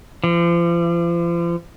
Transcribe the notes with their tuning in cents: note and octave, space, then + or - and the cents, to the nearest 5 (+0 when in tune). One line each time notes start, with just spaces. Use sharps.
F3 -40